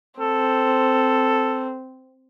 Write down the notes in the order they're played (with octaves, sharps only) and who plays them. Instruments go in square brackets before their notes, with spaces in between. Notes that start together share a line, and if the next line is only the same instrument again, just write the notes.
[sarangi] C4 [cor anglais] A4